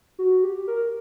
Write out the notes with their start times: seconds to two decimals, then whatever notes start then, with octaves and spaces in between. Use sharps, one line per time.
0.19 F#4
0.43 G4
0.68 A#4